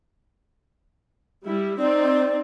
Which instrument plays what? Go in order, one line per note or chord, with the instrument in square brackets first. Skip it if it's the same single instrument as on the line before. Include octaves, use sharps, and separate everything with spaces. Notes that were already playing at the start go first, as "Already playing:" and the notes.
[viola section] G3 E4
[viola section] C4 D#4 [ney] D5